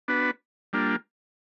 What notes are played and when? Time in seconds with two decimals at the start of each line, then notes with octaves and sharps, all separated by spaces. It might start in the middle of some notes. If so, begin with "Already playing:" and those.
0.08 B3 D4 F#4 B4
0.73 G3 A#3 D4 F4